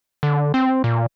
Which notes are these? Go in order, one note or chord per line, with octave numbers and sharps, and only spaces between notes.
D3
C4
A#2